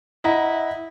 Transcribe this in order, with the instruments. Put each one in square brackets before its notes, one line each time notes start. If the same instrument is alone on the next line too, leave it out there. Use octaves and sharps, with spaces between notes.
[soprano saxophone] E4 [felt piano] D#5 F#5 A#5